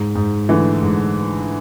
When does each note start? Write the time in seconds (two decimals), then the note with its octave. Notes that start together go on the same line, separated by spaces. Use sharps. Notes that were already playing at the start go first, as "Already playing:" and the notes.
Already playing: G#2
0.15 G#2
0.49 D3 E3 A3
0.82 G#2